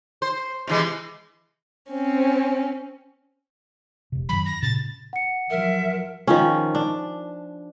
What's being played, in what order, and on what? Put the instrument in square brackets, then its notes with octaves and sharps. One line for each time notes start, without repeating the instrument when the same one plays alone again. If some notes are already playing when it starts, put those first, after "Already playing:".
[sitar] C5
C3 E3 G#3
[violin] C4 C#4
[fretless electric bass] E1 C3
[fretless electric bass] F#2 D#3 F#3 [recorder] B5
[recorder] A#6
[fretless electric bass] A#2 C#3 [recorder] A6
[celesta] F#5 C#7
[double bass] F3 F#3 [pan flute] A#4 [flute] E5
[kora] D#3 F3 C#4
D4